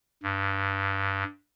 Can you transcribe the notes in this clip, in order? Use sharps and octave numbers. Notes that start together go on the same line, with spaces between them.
G2